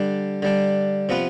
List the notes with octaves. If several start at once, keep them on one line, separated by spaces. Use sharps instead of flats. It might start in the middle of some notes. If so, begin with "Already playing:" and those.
Already playing: D3 G3 D4
D3 G3 D4
C3 F3 B3 F4 B4